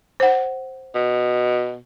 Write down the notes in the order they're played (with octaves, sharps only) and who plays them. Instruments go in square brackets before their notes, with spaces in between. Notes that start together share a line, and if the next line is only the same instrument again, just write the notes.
[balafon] C5 F#5
[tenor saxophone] B2